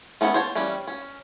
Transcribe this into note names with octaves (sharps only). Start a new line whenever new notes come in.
A3 B3 C#4 A4 F#5
C5 C#5 A5
E3 G3 C#4
C#4